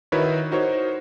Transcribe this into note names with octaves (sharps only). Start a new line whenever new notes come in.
D#3 E4 F#4 A#4 B4 C#5
D#4 F#4 A#4 C5 C#5